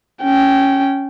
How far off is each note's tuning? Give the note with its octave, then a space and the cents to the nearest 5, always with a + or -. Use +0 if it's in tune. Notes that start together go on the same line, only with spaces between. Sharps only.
C#4 +0 G5 -15